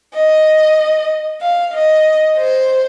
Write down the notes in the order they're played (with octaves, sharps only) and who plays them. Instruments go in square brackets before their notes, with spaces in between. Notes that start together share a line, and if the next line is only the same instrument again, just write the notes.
[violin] D#5
F5
D#5
C5